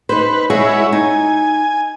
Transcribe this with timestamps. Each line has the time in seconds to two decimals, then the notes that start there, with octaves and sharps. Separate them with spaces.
0.09 D#4 B4 C5
0.50 G#3 E4 F#4 G#4 C#5
0.92 D#4 G#5